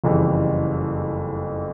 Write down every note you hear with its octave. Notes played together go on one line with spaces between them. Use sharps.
F#1 F2 C#3 E3 G3